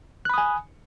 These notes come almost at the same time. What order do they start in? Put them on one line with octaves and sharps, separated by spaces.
F#6 B5 D#6 G#5